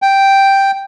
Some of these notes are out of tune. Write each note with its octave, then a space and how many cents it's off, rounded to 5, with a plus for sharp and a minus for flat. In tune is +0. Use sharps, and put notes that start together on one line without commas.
G5 +0